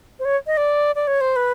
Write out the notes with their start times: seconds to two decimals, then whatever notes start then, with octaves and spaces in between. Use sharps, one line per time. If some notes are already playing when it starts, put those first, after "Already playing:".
0.19 C5
0.25 C#5
0.47 D#5
0.57 D5
0.96 D5
1.07 C#5
1.21 C5
1.36 B4